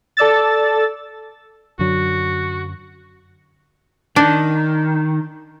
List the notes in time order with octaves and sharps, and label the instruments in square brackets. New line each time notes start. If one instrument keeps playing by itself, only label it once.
[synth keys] A4 D5 E6 A6
[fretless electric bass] F#2 D3 F#3 [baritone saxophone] F#4
[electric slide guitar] D#3 [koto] D4